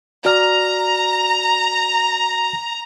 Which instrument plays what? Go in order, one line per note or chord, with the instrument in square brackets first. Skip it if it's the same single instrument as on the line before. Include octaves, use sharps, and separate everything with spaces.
[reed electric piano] F#4 D5 F6 [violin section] A#5